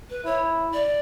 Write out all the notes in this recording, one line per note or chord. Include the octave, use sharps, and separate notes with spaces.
B4
E4 C#5
D5